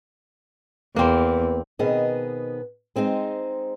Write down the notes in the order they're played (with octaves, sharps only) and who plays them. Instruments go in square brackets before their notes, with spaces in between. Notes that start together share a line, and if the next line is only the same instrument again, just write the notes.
[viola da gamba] E2 [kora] A#3 C4 [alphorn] B4
[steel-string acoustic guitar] B2 D#3 B3 C4 G#4 D#5
G#3 C4 D#4 C5